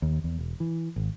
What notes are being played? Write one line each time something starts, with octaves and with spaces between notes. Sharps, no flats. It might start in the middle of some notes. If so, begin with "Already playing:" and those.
D#2
E2
E1
E3
G#1